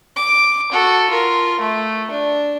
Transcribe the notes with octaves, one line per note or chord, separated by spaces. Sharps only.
D6
F#4 A4
F4 A#4
A3
D4